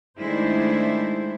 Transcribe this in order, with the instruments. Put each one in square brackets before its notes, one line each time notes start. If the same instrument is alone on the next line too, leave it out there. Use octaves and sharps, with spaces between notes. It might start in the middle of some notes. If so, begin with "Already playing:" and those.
[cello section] D#3 G#3 A3 D4 E4 C5